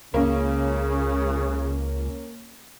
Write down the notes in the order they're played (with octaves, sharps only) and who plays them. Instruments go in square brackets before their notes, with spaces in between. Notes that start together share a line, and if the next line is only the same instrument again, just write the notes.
[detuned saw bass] C#2 [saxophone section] C#3 [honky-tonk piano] A#3 C#4